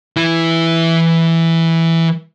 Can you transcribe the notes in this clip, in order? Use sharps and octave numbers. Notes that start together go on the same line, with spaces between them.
E3 E4